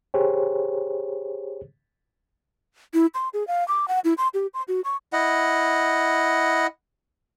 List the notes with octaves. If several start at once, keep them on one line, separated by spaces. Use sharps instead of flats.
G4 G#4 C5 C#5
E4
C6
G#4
F5
D6
F#5
E4
C6
G4
C6
F#4
C#6
E4 D#5 F#5